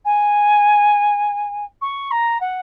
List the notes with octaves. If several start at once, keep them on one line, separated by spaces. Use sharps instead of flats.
G#5
C#6
A#5
F#5